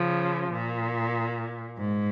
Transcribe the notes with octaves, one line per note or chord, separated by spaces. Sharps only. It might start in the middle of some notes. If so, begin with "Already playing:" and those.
Already playing: C#3 F3
A#2
G#2